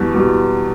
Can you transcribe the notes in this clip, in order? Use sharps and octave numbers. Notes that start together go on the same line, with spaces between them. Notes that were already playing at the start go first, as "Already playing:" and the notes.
Already playing: E2 B2 G3
B2 G3